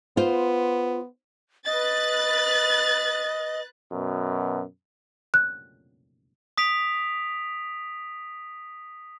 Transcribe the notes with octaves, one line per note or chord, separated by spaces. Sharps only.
B3 F4 C5
B4 D#5 F#6 A6
F#2 B2
F#6
D#6 B6 D7 F7